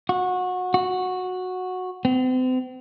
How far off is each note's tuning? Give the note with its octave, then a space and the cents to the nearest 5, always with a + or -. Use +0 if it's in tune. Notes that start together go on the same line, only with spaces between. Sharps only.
F#4 -25
F#4 -10
C4 -40